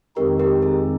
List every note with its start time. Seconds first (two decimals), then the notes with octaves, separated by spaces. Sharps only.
0.16 F2 D#3 G#3 C4 D#4 G4 A#4
0.39 G4 A#4
0.62 G#4